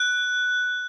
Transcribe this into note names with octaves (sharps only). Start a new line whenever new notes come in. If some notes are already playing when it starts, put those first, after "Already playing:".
Already playing: F#6